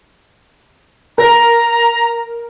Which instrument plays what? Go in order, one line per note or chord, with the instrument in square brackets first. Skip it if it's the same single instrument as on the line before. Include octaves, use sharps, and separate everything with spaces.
[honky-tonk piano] A#4 [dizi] A#5